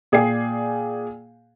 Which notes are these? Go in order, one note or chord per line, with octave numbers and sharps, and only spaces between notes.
A#2 G#4 D5 G5 G#5 C7